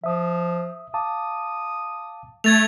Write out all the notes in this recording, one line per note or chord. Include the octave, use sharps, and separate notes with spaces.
F3 E5 D#6
F5 A5 D6 D#6
A3 G#6 A6 F7